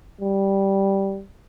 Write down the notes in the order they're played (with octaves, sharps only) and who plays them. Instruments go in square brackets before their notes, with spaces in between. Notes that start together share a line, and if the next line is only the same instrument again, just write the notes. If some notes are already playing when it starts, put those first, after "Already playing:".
[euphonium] G3